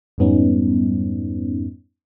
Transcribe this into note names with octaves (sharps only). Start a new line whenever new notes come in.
F2 G#2 G3 B3 C#4 D#4